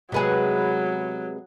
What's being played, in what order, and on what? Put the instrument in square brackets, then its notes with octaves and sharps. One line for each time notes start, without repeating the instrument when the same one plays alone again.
[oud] C3 G#3 G#4 [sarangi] F#3 [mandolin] B3 B4